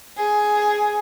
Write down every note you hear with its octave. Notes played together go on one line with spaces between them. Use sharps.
G#4